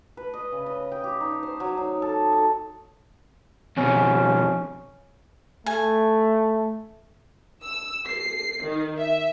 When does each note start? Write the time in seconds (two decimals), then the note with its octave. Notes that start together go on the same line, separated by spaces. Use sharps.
0.17 B4
0.34 D#5
0.52 C#3
0.66 D#5
0.92 G5
1.04 G4
1.21 D#4
1.43 C5
1.60 F#3
1.77 D#4
2.02 A4
2.33 A4
3.77 F2 B2 C#4
5.66 A3 G#5
7.63 E6
8.07 C7
8.63 D#3
8.98 E5